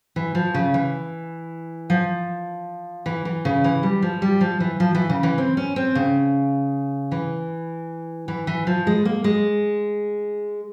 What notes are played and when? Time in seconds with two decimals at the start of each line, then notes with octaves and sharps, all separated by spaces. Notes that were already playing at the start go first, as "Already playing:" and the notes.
0.16 E3
0.35 F3
0.54 C#3
0.74 E3
1.90 F3
3.06 E3
3.25 E3
3.45 C#3
3.64 E3
3.83 G3
4.03 F3
4.22 G3
4.41 F3
4.60 E3
4.80 F3
4.95 E3
5.10 C#3
5.23 E3
5.38 C4
5.57 C#4
5.76 C4
5.95 C#3
7.12 E3
8.28 E3
8.47 E3
8.67 F3
8.87 G#3
9.05 A#3
9.24 G#3